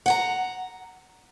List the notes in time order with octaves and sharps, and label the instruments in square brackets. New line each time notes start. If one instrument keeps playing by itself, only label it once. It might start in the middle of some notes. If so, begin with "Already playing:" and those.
[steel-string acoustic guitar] F#5 G5 A#5